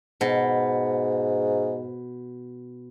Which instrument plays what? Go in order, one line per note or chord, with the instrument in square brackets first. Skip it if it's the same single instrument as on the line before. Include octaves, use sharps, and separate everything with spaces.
[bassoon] G#2 [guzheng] B2